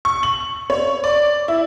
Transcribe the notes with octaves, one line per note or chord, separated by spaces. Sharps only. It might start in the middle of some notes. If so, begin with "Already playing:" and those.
C#6
F#7
C#5
D5
E4